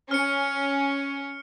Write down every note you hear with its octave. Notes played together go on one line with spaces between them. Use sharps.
C#4 F6 C#7